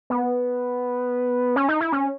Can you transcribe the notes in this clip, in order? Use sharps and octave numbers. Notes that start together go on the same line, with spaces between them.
B3
C#4
D#4
E4
C#4